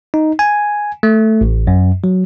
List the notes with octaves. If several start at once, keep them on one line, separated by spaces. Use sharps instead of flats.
D#4
G#5
A3
A1
F#2
F#3